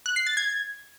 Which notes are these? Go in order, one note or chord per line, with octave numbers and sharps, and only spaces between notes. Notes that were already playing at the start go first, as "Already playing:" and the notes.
F#6
C7
A6
G#6